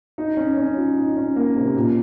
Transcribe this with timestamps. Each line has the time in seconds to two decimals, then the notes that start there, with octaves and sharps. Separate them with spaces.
0.18 D#4
0.37 C#4
0.57 C#4
0.77 F4
0.97 D#4
1.17 C#4
1.36 A#3
1.56 C3
1.76 A#2